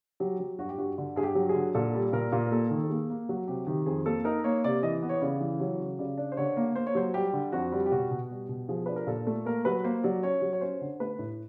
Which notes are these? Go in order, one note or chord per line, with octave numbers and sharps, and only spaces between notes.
F#3 G4
F#3
G2 F#4
G4
G2 F#4
D3
G2 G#4
G4
F#3
G#4
D3
A#2 A4
G3
A#2 A#4
A#2
A#4
A#3 A4
D#3
A4
A#3 G#4
A#3
F#3 F#4
C3 G4
D#3 G4
F2 G#4
A#3 A4
D#4 A#4
A#3 C#5
C3 D5
E3 D#5
B3
C#5
C#3 D5
E3
F#3 C#5
C#3
C#3 D5
D4
C5
D3 C#5
A#3
A#3 C5
C#5
F#3 C5
G3 G4
D3
F2 F#4
G3
G4
B2 F#4
B2
G3
B2
F3 G#4
D4 B4
A#4
A#2 A4
A3
A#3 A#4
F#3 B4
A#3 C5
F#3 D5
C#4 C#5
F#3
C#5
C#4 C5
D3
A3 B4
A2